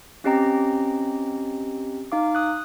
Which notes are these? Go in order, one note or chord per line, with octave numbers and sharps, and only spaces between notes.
C4 C#4 G4 D#5 G5 A#5
D#4 F5 D6
D#6 F#6